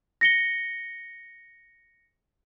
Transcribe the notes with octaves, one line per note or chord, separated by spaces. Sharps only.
A#6 C#7 G7